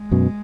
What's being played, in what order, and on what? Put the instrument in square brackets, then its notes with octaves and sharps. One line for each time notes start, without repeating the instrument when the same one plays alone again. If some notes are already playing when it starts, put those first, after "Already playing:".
Already playing: [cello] G#3
[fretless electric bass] F#2 B2